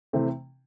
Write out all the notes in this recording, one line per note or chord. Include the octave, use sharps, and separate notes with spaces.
C3 E3 A3 C4